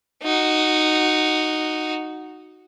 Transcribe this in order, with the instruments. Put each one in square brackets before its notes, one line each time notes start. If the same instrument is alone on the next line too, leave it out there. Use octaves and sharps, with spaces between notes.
[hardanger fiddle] D#4 F#4